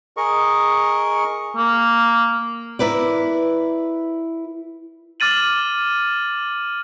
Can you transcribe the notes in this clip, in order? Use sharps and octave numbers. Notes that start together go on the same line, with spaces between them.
G#4 A#4 D#5 C#6
A#3
E4 A#4 B4 D5
D6 F6 A6 D#7 F#7